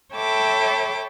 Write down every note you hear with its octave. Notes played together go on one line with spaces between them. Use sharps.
A4 C#5 E5 G5 B5 D6